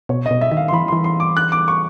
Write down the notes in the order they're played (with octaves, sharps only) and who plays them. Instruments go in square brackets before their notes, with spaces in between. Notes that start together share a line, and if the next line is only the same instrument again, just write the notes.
[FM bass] B2 [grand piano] C#5
[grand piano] D#5
[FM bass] B2
[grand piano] E5
[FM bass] D#3 [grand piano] E5
[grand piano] F5
C6
[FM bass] E3 [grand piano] B5
[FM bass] E3 [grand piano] C6
[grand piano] C6
D6
F#6
D6
C#6